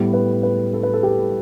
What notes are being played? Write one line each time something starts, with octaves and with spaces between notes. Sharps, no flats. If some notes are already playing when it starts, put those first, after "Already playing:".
Already playing: A2 G3 B3
B4
B4
A4
B4
A4
G4